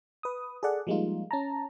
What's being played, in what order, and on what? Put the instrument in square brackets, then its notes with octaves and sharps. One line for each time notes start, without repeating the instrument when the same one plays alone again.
[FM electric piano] B4 D#6
G#4 A4 D5 F#5
F3 G3 G#3 A#3 D#4 F4
C#4 A5 A#5